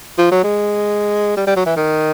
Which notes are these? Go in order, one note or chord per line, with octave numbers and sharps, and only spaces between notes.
F3
F#3
G#3
G3
G3
F#3
E3
D#3